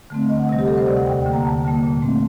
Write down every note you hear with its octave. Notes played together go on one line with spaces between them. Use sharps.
D3 A3 C4
D2 D#5
F#5
C3 G3 D#5
G4
D2 A4
C5
C3 G3 D5
F#5
D#2 G5
D3 G3 A#3
A#5
D#2 A5
D3 G3 A#3
A#2
A3 C4